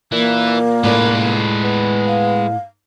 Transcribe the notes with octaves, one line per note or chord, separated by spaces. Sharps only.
A#2 E3 A#3
A2 G#3 F4 B4 D5
B3
F5